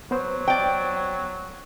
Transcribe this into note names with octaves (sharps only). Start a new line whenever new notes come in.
F#3 B3 C5
D5 G5